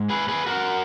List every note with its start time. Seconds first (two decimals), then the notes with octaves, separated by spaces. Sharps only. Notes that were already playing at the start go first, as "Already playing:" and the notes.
Already playing: G#2
0.10 G#4 B4
0.28 G#4 B4
0.46 F#4 A#4